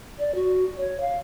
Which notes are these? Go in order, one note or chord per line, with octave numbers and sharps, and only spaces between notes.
D5
F#4
C#5
F5